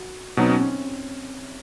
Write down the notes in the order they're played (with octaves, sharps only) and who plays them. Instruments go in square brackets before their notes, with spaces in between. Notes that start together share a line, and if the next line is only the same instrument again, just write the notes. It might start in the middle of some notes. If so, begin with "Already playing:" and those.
Already playing: [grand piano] F#4
[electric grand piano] B2 F#3 B3 D#4 [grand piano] C4
[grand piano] C#4
C#4